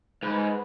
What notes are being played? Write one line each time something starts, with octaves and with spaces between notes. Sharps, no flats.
G#2 B4